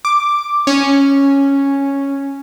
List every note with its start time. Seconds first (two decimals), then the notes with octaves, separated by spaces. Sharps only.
0.05 D6
0.67 C#4